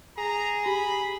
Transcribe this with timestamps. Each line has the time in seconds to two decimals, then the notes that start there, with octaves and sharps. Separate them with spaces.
0.18 G#4 A#5
0.66 G4 B5